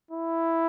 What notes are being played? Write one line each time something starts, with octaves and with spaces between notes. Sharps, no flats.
E4